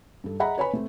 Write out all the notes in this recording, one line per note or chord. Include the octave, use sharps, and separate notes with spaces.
G2 A4
G#4 D#5 E5 F#5 A#5 B5
B4 C#5 G#5 B5
A3 C4